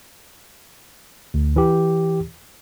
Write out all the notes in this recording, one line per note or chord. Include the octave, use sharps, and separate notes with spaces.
D2
E3 G4